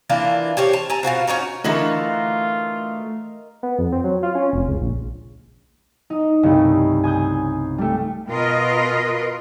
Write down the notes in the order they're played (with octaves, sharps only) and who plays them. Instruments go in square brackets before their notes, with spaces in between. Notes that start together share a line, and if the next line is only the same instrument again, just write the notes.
[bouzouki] E3 A#3 D4 F4
G4 C5 C#5 G5
A5
A4 G#5 A#5
B2 F4 F#4 C5
C#4 D#4 F#4 A#5
[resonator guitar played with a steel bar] D3 E3 F#4 [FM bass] A3 [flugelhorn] F4 [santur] A#4 D#5
[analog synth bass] B3
F2
C4
F#3
F4
C#4
F1
C#2
A#1
[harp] D#4
C2 G2 C#3 A3
G#5 D#6 G6
G3 A3
[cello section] B2 F4 A#4 B4 D#5